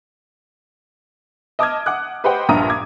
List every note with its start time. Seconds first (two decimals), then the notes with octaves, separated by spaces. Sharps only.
1.59 D#5 A5 D6 D#6 F6 G#6
1.86 F#5 D6 F#6
2.24 G4 B4 C5 D#5 F#5 G5
2.49 A#1 G2 A#2 A#5 D#6 D#7
2.70 D6 G#6